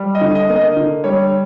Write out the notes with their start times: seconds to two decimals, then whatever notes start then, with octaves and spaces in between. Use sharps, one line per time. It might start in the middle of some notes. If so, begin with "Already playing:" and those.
Already playing: G3
0.15 D#5
0.21 D3
0.35 D#5
0.49 A#3
0.56 D#5
0.77 D3
1.04 G3 C#5